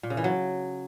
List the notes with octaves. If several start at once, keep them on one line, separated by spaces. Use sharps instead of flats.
A#2
C#3
E3
F#3